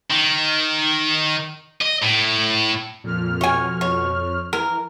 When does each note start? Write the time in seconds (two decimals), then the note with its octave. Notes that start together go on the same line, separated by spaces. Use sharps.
0.10 D#3
1.82 D#5
2.03 A2
3.04 F2 A#2 F6
3.41 B2 C#5 G#5
3.81 C#5
4.53 E3 A#4